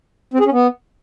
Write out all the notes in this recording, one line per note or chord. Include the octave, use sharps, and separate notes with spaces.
C4
G#4
C#4
B3